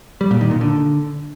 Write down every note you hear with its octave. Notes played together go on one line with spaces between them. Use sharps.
G3
A#2
D#3
A#2
D3